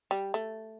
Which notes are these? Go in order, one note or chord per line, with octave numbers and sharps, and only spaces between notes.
G3
A3